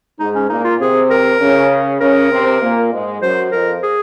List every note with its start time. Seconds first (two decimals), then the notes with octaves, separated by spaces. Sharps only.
0.19 G#2 G#3 D#4
0.35 C#4
0.50 A#2 A#3 D#4
0.64 F4
0.80 C3 C4 G#4
1.10 A#4
1.41 C#3 C#4
2.01 C#3 C#4 A#4
2.32 C3 C4
2.62 A#2 A#3
2.92 G#2 G#3
3.22 F#2 F#3 C5
3.52 F2 F3 A#4
3.83 G#4